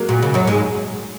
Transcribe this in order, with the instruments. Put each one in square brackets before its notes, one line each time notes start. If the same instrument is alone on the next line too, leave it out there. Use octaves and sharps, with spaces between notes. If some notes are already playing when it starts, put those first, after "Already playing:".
Already playing: [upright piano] F#3 G#3 A#3
[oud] A#2 [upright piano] F#4
[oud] C#3
F#2 F#3
G#2 G#3
[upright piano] G#4